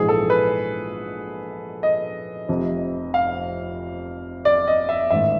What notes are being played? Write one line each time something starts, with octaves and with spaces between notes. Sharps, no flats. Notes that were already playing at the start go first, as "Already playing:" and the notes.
Already playing: A#1 G#2 E3 G#4
A4
B4
D#5
F1 F2 C3
F5
D5
D#5
E5
A1 G#2 D#3 E5